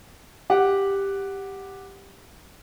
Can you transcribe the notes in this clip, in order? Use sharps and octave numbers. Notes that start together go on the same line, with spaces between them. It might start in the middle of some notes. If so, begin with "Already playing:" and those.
G4 F#5